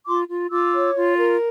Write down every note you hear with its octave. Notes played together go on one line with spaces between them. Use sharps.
F4 C6 D6
F4
F4 D6 E6
C#5
F4
A#4